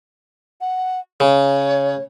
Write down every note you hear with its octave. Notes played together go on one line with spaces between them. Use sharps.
F#5
C#3 C#5